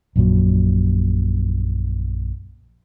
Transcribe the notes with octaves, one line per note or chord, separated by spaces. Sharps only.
A#1 F#2 A#2 F#3